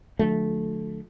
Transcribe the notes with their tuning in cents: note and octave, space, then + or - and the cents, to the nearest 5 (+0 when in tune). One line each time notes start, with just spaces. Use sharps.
D3 +5 F3 +45 A3 -15